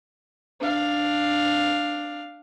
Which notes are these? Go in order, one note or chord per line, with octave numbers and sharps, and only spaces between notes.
D4 F5